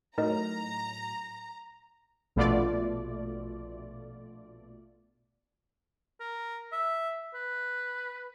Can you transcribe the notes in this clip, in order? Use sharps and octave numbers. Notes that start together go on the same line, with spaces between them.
A2 F#3 D#4 A#4 D#5 A#5
A#1 B2 A3 F4 D5
A#4
E5
B4